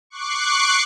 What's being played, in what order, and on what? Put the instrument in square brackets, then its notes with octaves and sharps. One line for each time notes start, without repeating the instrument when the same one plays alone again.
[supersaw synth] C#6 D6 F#6 C7